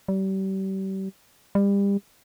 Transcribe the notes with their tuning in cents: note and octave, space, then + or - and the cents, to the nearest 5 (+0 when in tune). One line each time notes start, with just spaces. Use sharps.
G3 -35
G3 +30